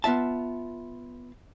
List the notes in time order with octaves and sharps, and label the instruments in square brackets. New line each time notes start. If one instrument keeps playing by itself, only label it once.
[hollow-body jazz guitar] B3 F4 E5 A5